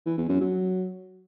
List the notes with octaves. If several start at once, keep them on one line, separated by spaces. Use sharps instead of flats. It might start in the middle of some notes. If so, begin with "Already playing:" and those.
E3
E2
F#2
F#3